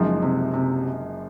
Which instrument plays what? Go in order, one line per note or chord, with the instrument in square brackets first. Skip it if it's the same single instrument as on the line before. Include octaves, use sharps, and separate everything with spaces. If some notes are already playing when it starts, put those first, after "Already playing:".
Already playing: [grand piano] F#1 F#2 F3 G#3 D#4
[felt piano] C3
C3